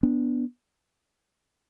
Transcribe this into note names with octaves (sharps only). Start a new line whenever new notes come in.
B3 D4